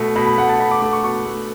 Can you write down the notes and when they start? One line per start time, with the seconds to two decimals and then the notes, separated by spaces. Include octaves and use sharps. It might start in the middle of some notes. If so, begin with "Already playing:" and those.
Already playing: B2 A3
0.16 B2 B5
0.26 B5
0.38 A3 F#5
0.49 A5
0.60 B2 B5
0.71 D6
0.82 A3 D6
0.93 C#6
1.04 B2 C#6
1.26 A3